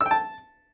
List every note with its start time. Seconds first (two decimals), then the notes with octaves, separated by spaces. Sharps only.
0.01 E6
0.06 G5
0.11 A5